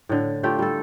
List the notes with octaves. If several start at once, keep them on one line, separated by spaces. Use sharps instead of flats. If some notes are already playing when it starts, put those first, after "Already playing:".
A2 D3
A3 F4 G4
G3 A4